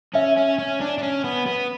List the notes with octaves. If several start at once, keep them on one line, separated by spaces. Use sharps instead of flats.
C#4 E5
C#4
C#4
D4
D4
C#4
B3
B3